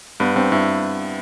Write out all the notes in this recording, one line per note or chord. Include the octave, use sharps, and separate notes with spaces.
G2 B3
G2 C4
G2 E4